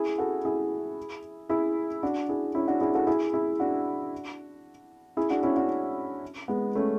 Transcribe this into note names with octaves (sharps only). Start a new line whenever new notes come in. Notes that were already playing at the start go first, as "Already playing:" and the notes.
Already playing: E4 G#4
F#4 A4
E4 G#4
E4 G#4
D4 F#4
E4 G#4
C#4 E4
D4 F#4
E4 G#4
F#4 A4
E4 G#4
E4 G#4
D4 F#4
E4 G#4
D4 F#4
C#4 E4
D4 F#4
G#3 B3
A3 C#4